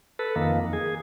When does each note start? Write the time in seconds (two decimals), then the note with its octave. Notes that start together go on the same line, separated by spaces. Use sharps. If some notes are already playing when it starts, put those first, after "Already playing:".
0.19 A4 B4
0.36 F2 D#3 A#3
0.73 G#4